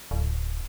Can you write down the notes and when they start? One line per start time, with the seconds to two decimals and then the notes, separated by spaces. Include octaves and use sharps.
0.11 D1